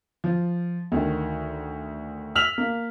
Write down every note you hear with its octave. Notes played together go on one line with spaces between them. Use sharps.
F3
D2 D#3
E6 F6 B6 F7 F#7
A#3